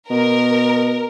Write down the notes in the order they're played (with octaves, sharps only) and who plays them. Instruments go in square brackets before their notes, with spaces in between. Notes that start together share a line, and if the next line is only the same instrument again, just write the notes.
[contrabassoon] B2 [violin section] A#4